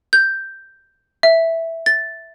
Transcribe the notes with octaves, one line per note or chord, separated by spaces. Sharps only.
G6
E5
A6